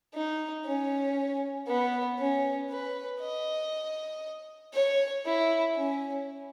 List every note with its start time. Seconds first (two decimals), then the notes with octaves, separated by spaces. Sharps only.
0.14 D#4
0.65 C#4
1.67 B3
2.19 C#4
2.70 B4
3.21 D#5
4.74 C#5
5.25 E4
5.76 C#4